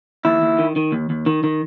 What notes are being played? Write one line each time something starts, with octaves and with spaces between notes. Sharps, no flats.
D#2 E4
D#2
D#3
D#3
D#2
D#2
D#3
D#3